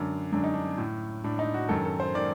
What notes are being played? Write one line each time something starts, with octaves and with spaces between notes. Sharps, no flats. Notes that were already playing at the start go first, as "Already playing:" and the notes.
Already playing: F#2 D3 D4
F#2 D3 D4
D#4
D4
A2
A2 D4
D#4
F#4
F#2 D#3 A4
A4
C5
D#3 D5